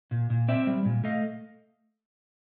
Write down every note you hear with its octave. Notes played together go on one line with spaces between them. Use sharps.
A#2
A#2
C4 D5 E5
G3
A#2
A3 D#5 F5